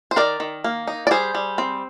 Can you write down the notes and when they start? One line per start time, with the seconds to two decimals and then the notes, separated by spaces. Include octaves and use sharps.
0.11 C5
0.16 D#3 A#4 D5
0.40 D#3
0.64 A#3
0.87 D#4
1.07 D5
1.11 G3 G#4 C5
1.35 G3
1.58 C4